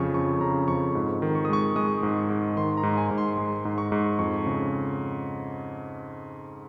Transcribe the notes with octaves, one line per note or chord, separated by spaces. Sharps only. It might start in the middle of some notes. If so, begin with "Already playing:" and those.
Already playing: F2 C#3 F3 C#6
F2 C#6
C#3 A#5
F2 C#6
G#2
D#3
C#6
D#6
G#3 C#6
G#3 D#6
G#2
C#6
G#2
D#3 C6
A#5
G#2
G#5
G#2
C6
G#3 C6
G#2
C#6
G#2
F2 C#6
C#3